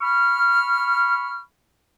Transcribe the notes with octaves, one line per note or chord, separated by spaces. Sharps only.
B5 C#6 F6